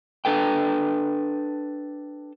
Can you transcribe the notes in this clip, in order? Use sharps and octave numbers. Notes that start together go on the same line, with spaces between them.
D4 A4 B4 G5